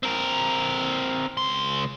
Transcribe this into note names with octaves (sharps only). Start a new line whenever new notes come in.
C4 A#4
C#2 C6